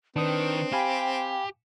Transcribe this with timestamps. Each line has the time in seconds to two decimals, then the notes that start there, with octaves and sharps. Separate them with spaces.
0.16 D#3 C4 D4 B4 D#6
0.73 G4 F5 G5 G#5 B5